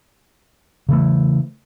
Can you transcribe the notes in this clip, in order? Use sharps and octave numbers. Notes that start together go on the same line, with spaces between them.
C#3 E3 A3